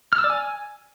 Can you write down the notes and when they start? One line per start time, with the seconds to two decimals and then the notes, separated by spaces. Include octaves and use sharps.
0.13 F6
0.18 E6
0.24 D5
0.30 G#5